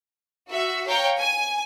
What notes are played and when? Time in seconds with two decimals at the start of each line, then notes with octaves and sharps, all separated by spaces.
0.49 F#4 E5
0.87 C#5 F5 G5 A#5
1.18 G#5